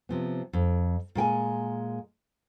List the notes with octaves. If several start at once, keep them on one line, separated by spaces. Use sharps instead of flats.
C3 F3 B3
F2
A#2 G#3 G5 G#5